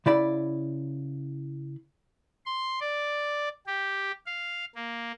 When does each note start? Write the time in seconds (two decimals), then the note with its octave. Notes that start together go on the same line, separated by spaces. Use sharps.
0.06 C#3 E4 D5 B5
2.46 C6
2.80 D5
3.67 G4
4.26 F5
4.75 A#3